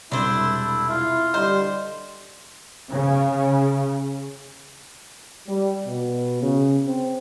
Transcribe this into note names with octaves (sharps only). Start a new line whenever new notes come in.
E1 C2 C3 D4 E4 C5
E4
E4 F4
D3 G3 C5 D5 D#5
C#3
G3
B2
C#3
C4